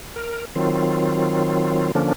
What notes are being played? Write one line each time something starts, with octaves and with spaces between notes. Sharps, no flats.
A#4
D#3 F#3 C4 F4
D3 F3 A#3 C#4 D4